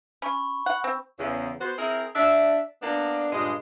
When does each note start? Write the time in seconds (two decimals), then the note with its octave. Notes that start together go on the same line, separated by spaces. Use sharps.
0.22 C#4 B5 C#6
0.66 F#5
0.84 C4
1.19 E2 C#3
1.60 B3 F#4 C5
1.78 C4 E4 G#4 A#4
2.15 D4 E5
2.82 A#3 B3 D4
3.31 G2 A#2 C#3 G#3